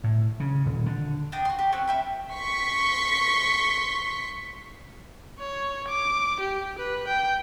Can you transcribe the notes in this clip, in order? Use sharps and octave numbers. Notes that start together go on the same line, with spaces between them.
A2
C#3
D#1
D3
D4 D#5 G5 A#5
F#4 C6
G4
C4 C#4 F#5
E5 G5 B5
C6 C#6 B6
C#5
D6
G4
B4
G5